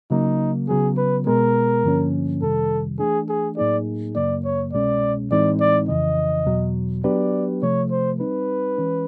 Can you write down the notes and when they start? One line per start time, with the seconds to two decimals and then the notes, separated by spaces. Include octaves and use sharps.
0.11 C#3 F#3 A#3 D#4
0.68 C#3 F#3 B3 G#4
0.97 B4
1.27 B2 G#3 B3 A#4
1.84 G2 D3 F3 A#3 C#4
2.42 F2 C3 D#3 G3 A4
2.99 E3 A3 D4 G#4
3.29 G#4
3.57 A2 F#3 A#3 D#4 G#4 D5
4.15 F#2 C#3 F#3 A#3 D5
4.44 C#5
4.73 C2 B2 G#3 C#4 D5
5.31 A2 E3 G#3 C4 D#4 D5
5.60 D5
5.88 F2 C#3 E3 D#5
6.46 E2 B2 F#3
7.04 F#3 B3 D4 G4 B4 D5
7.62 C3 F3 A3 C#5
7.91 C5
8.20 G3 C4 D#4 B4
8.78 E3 G#3 C#4